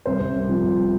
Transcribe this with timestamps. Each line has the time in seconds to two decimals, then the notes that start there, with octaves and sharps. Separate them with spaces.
0.06 C2 C5
0.20 C2
0.34 C2
0.49 F3
0.63 C2